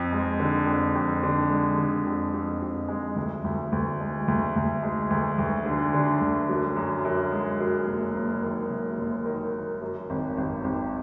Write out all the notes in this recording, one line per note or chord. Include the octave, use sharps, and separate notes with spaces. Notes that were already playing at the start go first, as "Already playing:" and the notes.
Already playing: F2
G#3
D3
F2
F2
D3
G#3
D3
F2
F2
F2
G#3
D2
D2
D2
G#3
D2
D2
G#3
D2
D2
D3
D3
D2
F#2
F#2
F#2
G#3
F#2
F#1
F#1
D#3
F#1
F#1
D#3
D#3
F#2
G#1
G#1
G#1